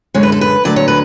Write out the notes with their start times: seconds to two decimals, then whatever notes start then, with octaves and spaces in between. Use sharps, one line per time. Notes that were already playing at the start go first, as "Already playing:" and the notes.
0.14 F#2 D3 G#3 C#5
0.23 B4
0.32 A4
0.41 B4
0.65 D2 D3 F#3 D5
0.76 C#5
0.88 B4